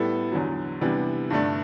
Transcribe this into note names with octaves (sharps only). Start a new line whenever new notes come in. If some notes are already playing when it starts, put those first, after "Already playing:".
Already playing: A2 G3 B3 E4 A4
E2 D3 F#3
C3 E3 G3 B3 D4
G2 D3 A3 D4